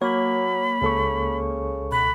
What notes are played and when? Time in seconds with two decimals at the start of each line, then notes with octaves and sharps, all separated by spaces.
0.02 F#3 A#3 C#5 B5
0.82 C#2 C#3 A4 C#6
1.92 B2 B5 F#6